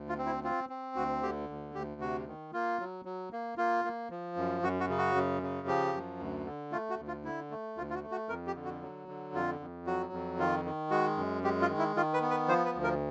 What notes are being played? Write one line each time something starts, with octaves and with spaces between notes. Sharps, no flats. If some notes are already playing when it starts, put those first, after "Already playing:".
Already playing: D2
F4
C4
E4
C4 F4
C4
D2 F#4
D3 G4
D2
D2 G4
C3 F#4
D#3
A#3 F4
F#3
F#3
A#3
A#3 F4
A#3
F3
F#2
F#2 F#4
F#4
C#3
F#4
F#2
C#3
F3 G4
F#2
D2
D3
A3 F4
F#4
D2
F4
D3 E4
A3
D2 F4
F4
F#4
A3
F#4
F2 A#4
G4
D3
F#4
F#3
D3
F2 F4
F2
F#3 F#4
F2
D#3 F4
D#3
G#3 F#4
F#2
G#3 G4
F4
D#3
E4
D#3 F4
B4
B3
B4
F3 C5
B4
D2
A#4